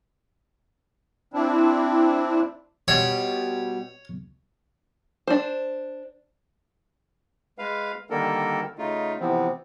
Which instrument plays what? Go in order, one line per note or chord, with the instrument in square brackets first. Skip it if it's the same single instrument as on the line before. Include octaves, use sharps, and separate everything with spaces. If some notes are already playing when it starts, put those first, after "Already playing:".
[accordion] C4 D4 E4
[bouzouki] B2 G3 F4 [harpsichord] C#5
[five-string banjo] D4 C5
[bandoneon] G#3 B4 F5
D3 D#3 G3 A#3 A4 A#4
C#3 A3 D#4 F4
C3 E3 F3 B3 C4